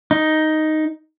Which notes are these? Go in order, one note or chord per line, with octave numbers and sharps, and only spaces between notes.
D#4